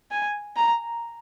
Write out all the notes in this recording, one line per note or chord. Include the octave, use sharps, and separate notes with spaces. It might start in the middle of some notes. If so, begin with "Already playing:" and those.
G#5
A#5